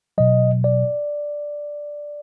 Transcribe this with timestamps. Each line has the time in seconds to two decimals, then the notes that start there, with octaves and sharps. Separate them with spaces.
0.18 B2 F#3 D#5
0.64 D5